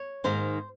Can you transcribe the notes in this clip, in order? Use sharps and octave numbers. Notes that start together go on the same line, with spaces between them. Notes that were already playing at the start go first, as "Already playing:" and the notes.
Already playing: C#5
G#2 D#3 A#3 C5